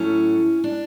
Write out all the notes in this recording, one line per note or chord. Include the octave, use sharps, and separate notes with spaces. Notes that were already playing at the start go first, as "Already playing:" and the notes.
Already playing: A2 F#3 A3 C#4
D4